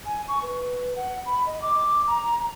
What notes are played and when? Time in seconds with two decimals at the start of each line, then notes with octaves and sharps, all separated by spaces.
0.06 G#5
0.28 C#6
0.42 B4
0.96 F#5
1.26 B5
1.46 D#5
1.62 D6
2.07 A#5